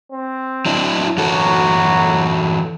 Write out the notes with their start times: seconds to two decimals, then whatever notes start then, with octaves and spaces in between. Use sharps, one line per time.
0.12 C4
0.66 F#3 D4 E4
1.18 E3 F#3 F#4 A4